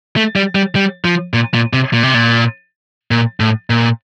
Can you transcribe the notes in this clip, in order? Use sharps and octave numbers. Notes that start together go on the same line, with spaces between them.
A3
G3
G3
G3
F3
A#2
A#2
C3
A#2
C3
A#2
A#2
A2
A#2